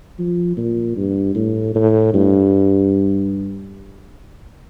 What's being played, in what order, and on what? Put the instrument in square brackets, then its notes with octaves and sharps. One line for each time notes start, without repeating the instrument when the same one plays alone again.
[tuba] F3
A#2
G2
A2
A2
G2